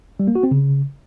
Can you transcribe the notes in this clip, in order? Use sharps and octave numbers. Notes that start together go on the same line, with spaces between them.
G3
A#3
F#4
C4
C#3